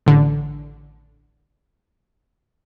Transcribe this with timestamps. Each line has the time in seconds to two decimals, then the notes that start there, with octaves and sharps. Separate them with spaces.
0.06 A1 D3